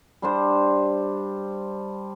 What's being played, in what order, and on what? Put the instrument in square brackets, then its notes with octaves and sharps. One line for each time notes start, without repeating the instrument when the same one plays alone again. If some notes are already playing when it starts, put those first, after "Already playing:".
[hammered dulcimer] G3 D4 C5